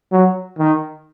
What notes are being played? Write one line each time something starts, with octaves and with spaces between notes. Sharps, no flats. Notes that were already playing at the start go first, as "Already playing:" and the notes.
F#3
D#3